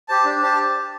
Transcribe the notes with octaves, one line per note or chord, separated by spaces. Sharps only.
G4 C5 A5
D4
G4 C5 A5